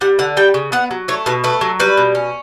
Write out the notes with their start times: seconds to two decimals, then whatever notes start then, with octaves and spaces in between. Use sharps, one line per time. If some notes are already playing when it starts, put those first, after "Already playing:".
0.01 G3 F#5
0.19 D3 F#5
0.37 G3 G5
0.54 C#3
0.72 B3 F#5
0.91 F#3
1.08 A3 C#5
1.26 B2 B4
1.44 A3 B4
1.61 F#3
1.80 G3 B4
1.97 B2
2.15 C#4